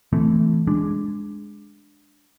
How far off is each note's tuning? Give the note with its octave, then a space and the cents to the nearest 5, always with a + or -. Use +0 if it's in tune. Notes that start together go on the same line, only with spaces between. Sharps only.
E3 +0 A3 +0 C4 -25
G#3 +0 D4 +0